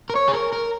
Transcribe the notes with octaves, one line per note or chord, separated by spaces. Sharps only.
A#4
C#5
G#4
A#4
A#4